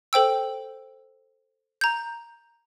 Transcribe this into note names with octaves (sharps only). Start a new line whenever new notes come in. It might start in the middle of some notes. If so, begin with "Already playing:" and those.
A4 C5 G5 E6
A#5 G6